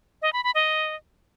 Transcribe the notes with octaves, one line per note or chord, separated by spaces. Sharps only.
D#5
B5
B5
D#5